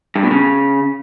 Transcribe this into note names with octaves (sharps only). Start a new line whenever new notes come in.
G2
B2
C#3